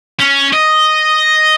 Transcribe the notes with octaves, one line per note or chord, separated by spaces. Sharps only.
C#4
D#5